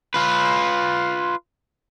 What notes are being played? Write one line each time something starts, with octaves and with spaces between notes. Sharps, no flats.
F4 B4